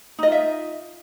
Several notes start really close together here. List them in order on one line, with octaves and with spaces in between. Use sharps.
D#4 D#5 F4 E5